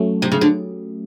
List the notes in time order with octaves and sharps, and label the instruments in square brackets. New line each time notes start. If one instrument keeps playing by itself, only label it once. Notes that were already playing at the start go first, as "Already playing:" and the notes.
Already playing: [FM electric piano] F#3 A3 C#4
[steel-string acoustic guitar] C3
C#3
D3